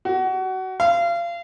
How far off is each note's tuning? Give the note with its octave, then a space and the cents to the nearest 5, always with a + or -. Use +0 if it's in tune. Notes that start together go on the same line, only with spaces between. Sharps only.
F#4 +25
F5 -30